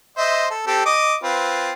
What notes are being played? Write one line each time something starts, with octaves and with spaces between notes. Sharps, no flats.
C5 D#5 E5
A4
C4 G4 A4
D#5 D6 D#6
C4 F4 B4